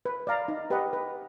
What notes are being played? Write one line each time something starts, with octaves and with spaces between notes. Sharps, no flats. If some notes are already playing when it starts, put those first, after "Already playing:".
B4
D5 F5 A#5
D#4
G4 B4 D#5 F#5
B4